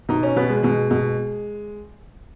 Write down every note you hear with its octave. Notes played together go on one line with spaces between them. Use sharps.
B2 D#4
C#4
B2 B3
G#3
B2 G#3
B2